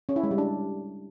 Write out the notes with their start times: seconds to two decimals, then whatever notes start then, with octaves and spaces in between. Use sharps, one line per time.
0.09 C#4
0.16 E4
0.23 G#3
0.31 G3
0.38 D4